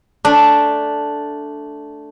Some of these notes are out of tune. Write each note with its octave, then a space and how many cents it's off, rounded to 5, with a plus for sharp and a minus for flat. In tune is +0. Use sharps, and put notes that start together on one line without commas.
A3 +0 D4 -5